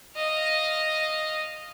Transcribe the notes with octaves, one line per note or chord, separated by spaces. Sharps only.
D#5 F5